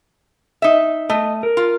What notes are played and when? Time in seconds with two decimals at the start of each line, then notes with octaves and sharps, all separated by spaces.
0.62 D#4 E5
1.10 A3 D#5
1.43 A#4
1.57 F4